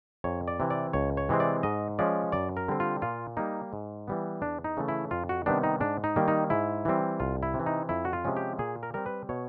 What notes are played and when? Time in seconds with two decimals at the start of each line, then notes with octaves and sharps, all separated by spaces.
0.24 F2 C#5
0.48 D5
0.60 C3 E3
0.70 D5
0.93 C#2 C#5
1.17 C#5
1.29 C3 E3 G#3 C4
1.40 D5
1.63 G#2 D#5
1.99 F3 G#3 C#4 D5
2.32 F#2 D5
2.57 A#4
2.68 D3 G3 C4
2.80 F4
3.02 A#2 F4
3.37 G3 A#3 D#4
3.73 G#2
4.08 E3 G3 B3
4.42 E2 D4
4.64 D#4
4.77 C#3 E3 A3
4.88 E4
5.11 F2 F4
5.29 F#4
5.46 C3 D#3 G3 B3 D4
5.64 D#4
5.80 G#2 D4
6.04 D#4
6.16 D#3 G3 A#3
6.28 D#4
6.50 G#2 E4
6.85 E3 G3 C4
7.20 C2 F4
7.43 E4
7.54 C3
7.60 E3
7.66 D#4
7.89 F2 E4
8.05 F#4
8.13 F4
8.25 C3 F3 G#3 C#4
8.37 G4
8.59 A#2 G#4
8.83 A#4
8.94 G3 C4 A#4
9.06 B4
9.29 B2 C#5